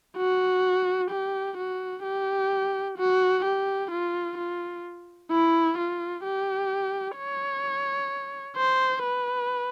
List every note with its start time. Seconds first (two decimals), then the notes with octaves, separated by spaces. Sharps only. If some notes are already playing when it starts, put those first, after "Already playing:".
0.17 F#4
1.10 G4
1.57 F#4
2.04 G4
2.98 F#4
3.45 G4
3.91 F4
4.38 F4
5.31 E4
5.78 F4
6.24 G4
7.17 C#5
8.57 C5
9.03 B4